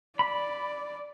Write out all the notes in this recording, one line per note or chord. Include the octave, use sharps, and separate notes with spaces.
D5 B5